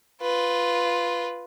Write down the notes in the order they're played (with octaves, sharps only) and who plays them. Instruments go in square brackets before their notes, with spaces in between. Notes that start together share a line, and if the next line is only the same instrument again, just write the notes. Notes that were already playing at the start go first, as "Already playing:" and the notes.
[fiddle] F4 B4